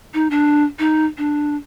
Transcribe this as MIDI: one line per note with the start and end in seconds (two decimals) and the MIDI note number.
0.14 0.28 63
0.31 0.64 62
0.79 1.05 63
1.18 1.56 62